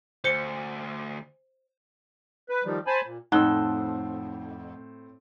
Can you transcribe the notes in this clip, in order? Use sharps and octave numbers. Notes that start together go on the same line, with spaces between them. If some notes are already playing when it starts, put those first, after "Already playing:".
D2 C5 C#7 G7
B4
D#3 F3 G3
C5 G#5 A5 B5
A#2
F2 A2 C4 D#4 F#5 E6 F#6 G7